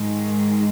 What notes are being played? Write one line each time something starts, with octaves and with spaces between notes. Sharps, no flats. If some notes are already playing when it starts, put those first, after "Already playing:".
Already playing: G#2 D#3 G#3